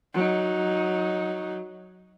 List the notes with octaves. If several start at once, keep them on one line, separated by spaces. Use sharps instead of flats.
F#3 D#4